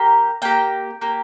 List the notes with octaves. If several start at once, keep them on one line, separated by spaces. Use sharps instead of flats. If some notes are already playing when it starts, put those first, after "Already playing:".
Already playing: A#3 G4 A#5
A#3 G4 G5
A#3 G4